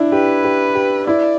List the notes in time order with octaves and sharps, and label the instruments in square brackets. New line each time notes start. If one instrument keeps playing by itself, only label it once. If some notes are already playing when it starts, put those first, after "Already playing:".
Already playing: [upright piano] D4 E4
[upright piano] G4 [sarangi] B4
[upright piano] G4
G4
[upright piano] E4 [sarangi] D5